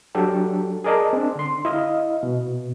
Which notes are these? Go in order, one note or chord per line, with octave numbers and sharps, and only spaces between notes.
F#3 D4 G4 A4
G#4 A#4 D5 D#5 A5
C4 D4
D3 C6
E4 D#5 F5
B2